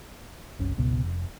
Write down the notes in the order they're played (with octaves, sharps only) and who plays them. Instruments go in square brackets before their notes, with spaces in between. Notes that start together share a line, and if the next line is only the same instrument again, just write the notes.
[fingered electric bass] F#1 C2 C3 C#4
G#1 C#2 B2
F1